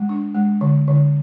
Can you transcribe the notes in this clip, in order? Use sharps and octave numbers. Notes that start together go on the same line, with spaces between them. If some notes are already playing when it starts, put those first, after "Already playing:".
Already playing: G#3
D4
G#3
D3
D3